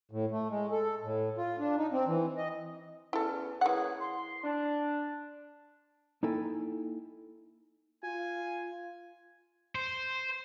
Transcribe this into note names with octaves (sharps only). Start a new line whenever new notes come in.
A2
A3
G#3
A4
A2
F4
D4
D#4
C4
E3
D#5
E2 C#4 E4 A4
E3 A#3 C#4 G#4 F#5
C6
D4
A#3 D#4 E4 A4 G5 G#5
F4 G#5
C5